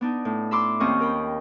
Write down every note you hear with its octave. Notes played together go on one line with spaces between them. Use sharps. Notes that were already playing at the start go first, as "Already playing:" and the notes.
B3 D4 D#4
A2
E5 B5 C6 D6 E6
D#2 C4 C#4 D#5 C#6 F6
A#4 G5 B5